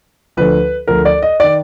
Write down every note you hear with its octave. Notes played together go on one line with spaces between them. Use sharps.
D2 D3 F3 B4
D2 D3 F3 A#4
D5
D#5
D#3 D5